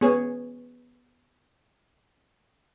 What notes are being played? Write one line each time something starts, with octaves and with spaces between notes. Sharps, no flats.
B3 G#4 C#5